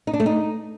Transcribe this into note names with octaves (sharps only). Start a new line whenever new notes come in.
D#4
D4
A3
D#4